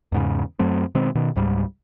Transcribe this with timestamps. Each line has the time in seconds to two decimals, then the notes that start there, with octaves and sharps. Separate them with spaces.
0.12 E2 G#2 C#3
0.59 F#2 F#3 A3 C4
0.95 B2 D#3 G#3 C4
1.15 B2 D#3
1.36 C#2 G#2 G3